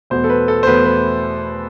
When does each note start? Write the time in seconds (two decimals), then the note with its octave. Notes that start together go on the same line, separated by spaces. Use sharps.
0.10 E2 B2 A3 C5
0.24 A4
0.30 B4
0.48 A4
0.63 C5
0.66 E2 B2 A3 B4
0.86 B4